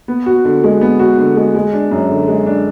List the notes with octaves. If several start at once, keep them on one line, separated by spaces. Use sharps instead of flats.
B3
F#4
D3
G#3
B3
F#4
D3
G#3
G#3
D4
F#2
D3
G#3
D4